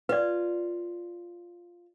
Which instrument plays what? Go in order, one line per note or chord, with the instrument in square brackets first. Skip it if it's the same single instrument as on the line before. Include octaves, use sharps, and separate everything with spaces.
[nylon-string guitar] F4 [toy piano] B4 D5